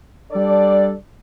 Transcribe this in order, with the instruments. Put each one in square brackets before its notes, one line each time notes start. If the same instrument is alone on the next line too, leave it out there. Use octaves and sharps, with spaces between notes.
[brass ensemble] G3 D4 A4 D5